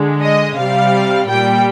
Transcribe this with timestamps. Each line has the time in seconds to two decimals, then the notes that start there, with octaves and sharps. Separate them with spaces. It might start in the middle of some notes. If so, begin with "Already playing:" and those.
Already playing: D3 G#3
0.22 D#5
0.57 C3 G3 F5
1.28 A#2 G3 G5